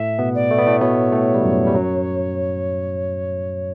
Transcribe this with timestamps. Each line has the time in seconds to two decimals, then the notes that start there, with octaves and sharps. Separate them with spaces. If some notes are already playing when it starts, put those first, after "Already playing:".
Already playing: A2 A3 E5
0.19 B2 B3
0.34 D5
0.50 A3
0.59 B3
0.67 A2 A3
0.81 B2 B3 C#5
1.12 A2 A3
1.34 G3
1.43 F#2 F#3
1.67 G3
1.75 F#2 F#3